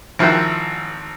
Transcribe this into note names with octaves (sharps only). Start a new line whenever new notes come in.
G#1 F3 E4 F#4 A#4 G5